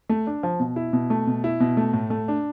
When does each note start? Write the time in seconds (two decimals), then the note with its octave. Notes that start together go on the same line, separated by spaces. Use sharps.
0.09 A3
0.27 D4
0.43 F3
0.60 B2
0.76 E4
0.93 B2
1.10 A3
1.27 B2
1.44 E4
1.60 B2
1.77 A3
1.93 A2
2.10 A3
2.28 D4